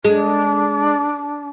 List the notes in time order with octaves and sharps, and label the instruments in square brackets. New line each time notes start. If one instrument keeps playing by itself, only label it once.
[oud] G#3 [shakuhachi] D4